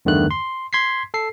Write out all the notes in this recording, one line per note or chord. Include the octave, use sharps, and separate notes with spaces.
E2 G2 D3 D#3 A3 F#6
C6
C6 G#6 B6 C7
A4 C7